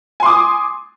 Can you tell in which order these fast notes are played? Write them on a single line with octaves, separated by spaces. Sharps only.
G#5 C6 D6 D#6